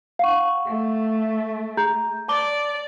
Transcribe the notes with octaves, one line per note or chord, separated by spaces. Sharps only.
F5 F#5 C#6
A3
G#4 A#5 G6
D5 A5 D6 G7